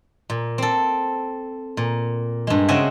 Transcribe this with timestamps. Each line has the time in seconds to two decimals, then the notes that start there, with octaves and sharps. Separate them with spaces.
0.30 A#2
0.58 C4 A4
1.77 A#2
2.47 G2 G#3
2.68 C#3 C4 F#4 D#5 E5 G#5